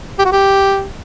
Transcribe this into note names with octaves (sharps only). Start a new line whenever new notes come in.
G4
F#4
G4